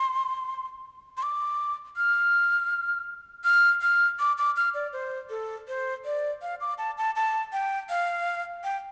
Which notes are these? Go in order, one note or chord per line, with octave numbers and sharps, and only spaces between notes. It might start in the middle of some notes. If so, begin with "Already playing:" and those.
Already playing: C6
C6
D6
F6
F6
F6
D6
D6
F6
D5
C5
A4
C5
D5
F5
D6
A5
A5
A5
G5
F5
G5